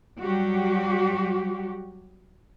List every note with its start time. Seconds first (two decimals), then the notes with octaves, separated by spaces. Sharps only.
0.22 F#3 G3 F#4 G4